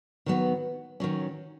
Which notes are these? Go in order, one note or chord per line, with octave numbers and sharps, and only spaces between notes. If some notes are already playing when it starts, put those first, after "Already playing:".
D#3 F#3 B3
D#3 F#3 C#4